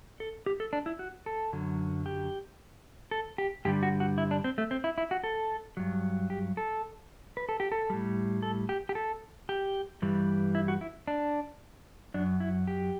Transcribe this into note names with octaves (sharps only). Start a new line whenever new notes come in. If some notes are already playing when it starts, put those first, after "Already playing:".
A4
G4
A4
D4
E4
F#4
A4
F#2 D3 F#3
G4
A4
G4
G2 D3 G3 G4
F#4
F#4
E4
D4
C4
A3
C4
E4
E4
F#4
A4
G2 F#3
G4
A4
B4
A4
G4
A4
A2 G3
A4
G4
G4
A4
G4
G2 E3 G3
E4
F#4
E4
D4
F#2 F#3 D4
E4
G4